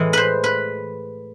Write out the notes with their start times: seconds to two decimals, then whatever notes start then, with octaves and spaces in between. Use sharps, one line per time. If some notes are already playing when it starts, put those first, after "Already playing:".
Already playing: A2 E3 G#3
0.13 B4 C5
0.44 B4